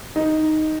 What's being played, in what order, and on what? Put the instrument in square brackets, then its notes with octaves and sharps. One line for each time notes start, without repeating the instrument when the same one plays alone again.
[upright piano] D#4